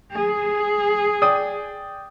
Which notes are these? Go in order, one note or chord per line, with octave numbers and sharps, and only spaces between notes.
G#4
D5 G5 D#6